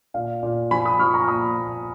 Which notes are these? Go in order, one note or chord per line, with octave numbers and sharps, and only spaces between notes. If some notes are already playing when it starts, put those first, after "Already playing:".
A#2 F5
A#2
F3 G#5 B5
B5 D#6
F3 C#6 F6
A#5 C#6
A#2 B5 D#6
A#2